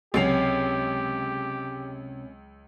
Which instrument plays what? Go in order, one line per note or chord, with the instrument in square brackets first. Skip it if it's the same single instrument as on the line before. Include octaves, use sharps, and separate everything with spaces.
[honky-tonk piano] C#2 C7 F7 [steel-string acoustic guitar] C3 C#4 G#4 [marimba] F#3 [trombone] G4